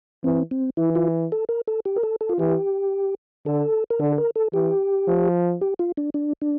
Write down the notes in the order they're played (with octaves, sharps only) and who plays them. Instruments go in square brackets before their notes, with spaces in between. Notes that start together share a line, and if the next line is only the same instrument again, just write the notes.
[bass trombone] E3 [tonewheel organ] C4
[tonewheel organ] C4
[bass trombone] E3 [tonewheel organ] E4
[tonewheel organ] F4
A4
A#4
A4
G4
A#4
A4
A4
F4
[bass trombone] E3 [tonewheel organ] G4
[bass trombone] D3 [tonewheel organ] A4
[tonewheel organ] A#4
[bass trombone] D3 [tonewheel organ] A4
[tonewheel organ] A#4
A4
[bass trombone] E3 [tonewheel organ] G4
[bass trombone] F3
[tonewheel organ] G4
F4
D4
D4
D4